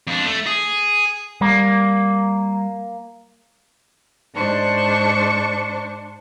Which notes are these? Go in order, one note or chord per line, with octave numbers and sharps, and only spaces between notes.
F2 D4
A3
G#4
G3 A#3
G#2 D4 C5 C#6